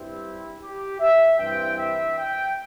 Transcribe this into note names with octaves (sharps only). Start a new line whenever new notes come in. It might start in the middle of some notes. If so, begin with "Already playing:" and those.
Already playing: G2 G3 C4 E4
G4
E5
G2 E3 C4 G5
E5
G5